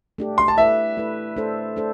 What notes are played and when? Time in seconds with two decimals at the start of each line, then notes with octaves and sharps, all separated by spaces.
0.18 A3 D4 G4
0.38 C6
0.48 A5
0.58 A3 E4 B4 E5
0.97 A3 E4 B4
1.37 A3 D4 A4 C5
1.76 A3 D4 A4 C5